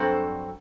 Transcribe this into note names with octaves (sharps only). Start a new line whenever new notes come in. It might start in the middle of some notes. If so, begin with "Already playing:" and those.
Already playing: G2 F#3 C4 F#4 A4 C5